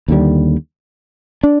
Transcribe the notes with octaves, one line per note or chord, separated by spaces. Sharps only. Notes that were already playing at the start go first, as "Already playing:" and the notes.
D#2 D3 G3
D4